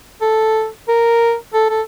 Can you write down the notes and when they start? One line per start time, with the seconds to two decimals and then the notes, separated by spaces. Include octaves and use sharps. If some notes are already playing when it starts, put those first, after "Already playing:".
0.21 A4
0.88 A#4
1.54 A4
1.70 A4